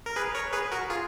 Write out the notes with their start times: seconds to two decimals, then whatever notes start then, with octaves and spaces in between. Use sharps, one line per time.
0.06 A#4
0.16 G#4 B4
0.35 A#4 C#5
0.53 G#4 B4
0.72 F#4 A#4
0.90 F4 G#4